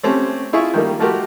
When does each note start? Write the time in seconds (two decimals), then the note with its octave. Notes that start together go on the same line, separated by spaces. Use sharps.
0.03 A3 C4 C#4 G4
0.53 E4 F4 G#4 E5 C#6
0.74 D#3 G3 A#3
0.99 F3 A3 F#4 G4 A#4